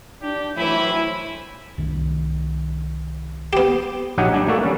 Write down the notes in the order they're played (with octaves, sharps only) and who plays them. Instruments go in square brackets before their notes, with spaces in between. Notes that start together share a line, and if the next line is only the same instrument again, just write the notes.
[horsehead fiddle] D4 [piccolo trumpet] G4
[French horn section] A2 E3 [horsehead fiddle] F#3 C5 [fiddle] E4 G#5 [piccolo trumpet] B5
[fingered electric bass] C2 D#3
[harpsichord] B3 G4
[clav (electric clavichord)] A#1 F#3 D#4 G4 F#5 G#5
G3 D4 G#5
A3 A#3 D4 F#4 A4
G3 C#4